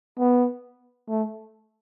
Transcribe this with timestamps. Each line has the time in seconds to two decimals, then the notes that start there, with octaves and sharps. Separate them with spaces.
0.19 B3
1.09 A3